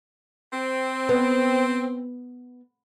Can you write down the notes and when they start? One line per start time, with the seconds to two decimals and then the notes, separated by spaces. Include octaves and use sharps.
0.53 C4
1.09 B3